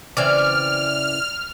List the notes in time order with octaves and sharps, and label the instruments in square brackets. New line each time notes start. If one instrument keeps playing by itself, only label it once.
[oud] C#3 E3 C4 [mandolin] D5 [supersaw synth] F6